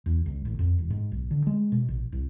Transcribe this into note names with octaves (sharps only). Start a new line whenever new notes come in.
E2
C#2
A1
F2
E1
G#2
B1
D3
G#3
B2
A#1
C2